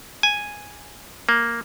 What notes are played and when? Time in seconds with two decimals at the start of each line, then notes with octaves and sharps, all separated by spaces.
0.23 G#5
1.29 A#3